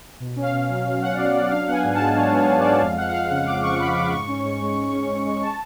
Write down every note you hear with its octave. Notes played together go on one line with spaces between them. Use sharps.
B2
C#4
F5
B2
F#3
B2
C#4 F#5
D5
B2 F5
F#3 D5
D4 F5
B3 F#5 G#5
G#2
A5
G#3
D4 C#5
B3
C#5
G#2
D5
G#3
F2 F5
F3 F#5
F#5
F2 F5
C#3 F#5
F2 D6
F3 C#6
F2 B5
C#3 D6
G#2 C#6
C#4
G#2
G#3
G#2
C#4
G#2
G#3
A5